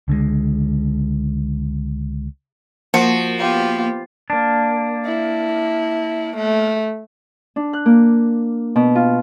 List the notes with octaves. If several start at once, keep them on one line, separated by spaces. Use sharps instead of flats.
C#2 D3 E3 G#3
F3 A#3 F#4
B3 F4 G4
A#3 D4
E4
A3
D4
F#6
A#3
B2
F4